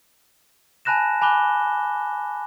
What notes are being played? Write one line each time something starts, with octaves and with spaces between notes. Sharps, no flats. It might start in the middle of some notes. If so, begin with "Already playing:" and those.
G#5 A5 B5 F#6 A#6 E7
G#5 B5 D6 F#6 G7